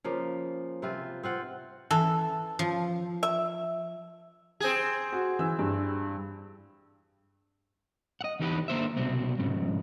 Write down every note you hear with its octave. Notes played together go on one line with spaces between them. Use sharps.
C#3 F3 A#3
C3 C4 F4 B4
C4 F4 F#5
E3 A4
F3
E5
C4 G#4
F#4
E3 E6
G2
D#5 F#5
E2 E3 D#4 G4 A4 B4
D3 A#3 C5 E5
C2 B2 C4
F2 G#2 C#3